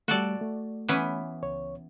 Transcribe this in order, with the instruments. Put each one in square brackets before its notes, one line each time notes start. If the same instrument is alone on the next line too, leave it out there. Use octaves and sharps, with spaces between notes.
[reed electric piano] G3 A3 [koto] F#4 A4 D5
[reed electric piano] A3
[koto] E3 B3 C#4
[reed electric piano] C#2 C#5